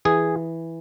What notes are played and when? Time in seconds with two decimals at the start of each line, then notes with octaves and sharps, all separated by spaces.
0.05 E3 G#4